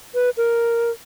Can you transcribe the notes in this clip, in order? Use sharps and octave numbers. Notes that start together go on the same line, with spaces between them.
B4
A#4